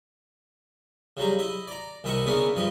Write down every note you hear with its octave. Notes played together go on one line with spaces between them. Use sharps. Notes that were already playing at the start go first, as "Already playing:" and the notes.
C#3 F#3 G3 A#5
E4 D#5
D5 A#5
C2 D#3 E4 D#5 A#5 C#6
C#3 B3 C#4 D4 E4 A#4
G2 F3 G3 D#5